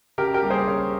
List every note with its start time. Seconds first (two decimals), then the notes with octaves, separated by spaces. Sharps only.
0.18 C#3 G4 A#4
0.34 G4 A#4
0.43 G3 A#3
0.50 G#4 C5
0.67 C#3 A#4 C#5